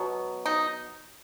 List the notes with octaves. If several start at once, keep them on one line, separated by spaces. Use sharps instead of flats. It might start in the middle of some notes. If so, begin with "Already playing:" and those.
Already playing: B2 F#3 B3
D#4